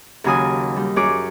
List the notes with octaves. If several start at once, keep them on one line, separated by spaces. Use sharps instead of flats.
D#2 C#3 F#3 G#5 D#6
G3 D#4
F#2 G#4 C#5 D6